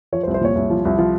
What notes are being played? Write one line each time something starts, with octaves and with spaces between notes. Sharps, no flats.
F3 C#5
C5
C2
C5
A#2 C#5
C2
F3
C2
F3